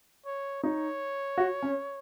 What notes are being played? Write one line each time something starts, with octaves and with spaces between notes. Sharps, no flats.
C#5
D#4 C#5
F#4
C#4